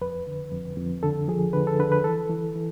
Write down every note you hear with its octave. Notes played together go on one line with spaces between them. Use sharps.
F2 B4
D3
F2
F2
D3 A4
F3 G#4
D3 B4
A4
D3 B4
B4
E3 A4
E3
E3